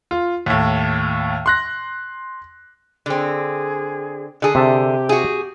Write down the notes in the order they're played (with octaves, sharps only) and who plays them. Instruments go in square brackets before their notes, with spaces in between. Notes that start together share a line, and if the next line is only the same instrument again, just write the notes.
[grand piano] F4
D#2 A2
C6 F#6 A#6
[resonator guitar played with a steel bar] D3 C4 [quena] G#4
[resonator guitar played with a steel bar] D3 G#4 [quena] A5
[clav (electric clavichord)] C3 E5 A5 [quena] G4
[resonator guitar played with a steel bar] F#4 G#4